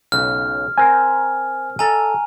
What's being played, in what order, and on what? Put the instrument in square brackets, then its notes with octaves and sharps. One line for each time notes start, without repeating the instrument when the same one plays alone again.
[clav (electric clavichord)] B1 C#3 [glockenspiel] F6
[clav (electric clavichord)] C4 A#4 C5 [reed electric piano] G#5
[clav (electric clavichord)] A4 D#5 [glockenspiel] G#5 A#5